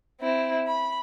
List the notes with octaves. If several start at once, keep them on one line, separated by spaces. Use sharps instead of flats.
C4 E4
B5